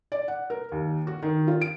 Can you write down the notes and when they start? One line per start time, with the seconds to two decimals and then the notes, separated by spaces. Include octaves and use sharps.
0.12 D5
0.28 F#5
0.50 A#4
0.72 D#2
1.07 F#4
1.23 D#3
1.48 F4
1.61 D7